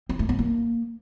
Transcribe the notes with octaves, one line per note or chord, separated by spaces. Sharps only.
C4
A3
B3
A#3